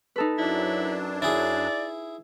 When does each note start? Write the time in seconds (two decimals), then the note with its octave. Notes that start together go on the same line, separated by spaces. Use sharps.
0.16 D#4 A4 B4
0.38 F#2 F#3 D4 E4
1.22 E4 G#4 D5